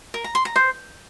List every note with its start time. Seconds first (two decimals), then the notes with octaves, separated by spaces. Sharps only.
0.14 A#4
0.24 A#5
0.35 C6
0.45 A#5
0.56 C5